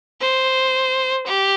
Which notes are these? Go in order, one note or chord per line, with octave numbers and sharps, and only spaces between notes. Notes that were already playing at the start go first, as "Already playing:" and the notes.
C5
G4